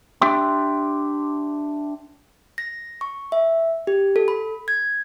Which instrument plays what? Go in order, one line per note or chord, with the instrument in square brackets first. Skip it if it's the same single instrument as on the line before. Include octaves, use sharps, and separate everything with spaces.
[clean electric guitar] D4 G4 E5 G5 C6
[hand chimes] A#6
C#6
E5
G4
A4
B5
G#6